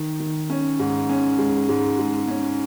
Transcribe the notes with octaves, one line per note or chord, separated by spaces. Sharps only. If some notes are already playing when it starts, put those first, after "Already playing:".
Already playing: D#3
D#3
C#4
G#2
C#4
G#3
G#2
G#3
C#4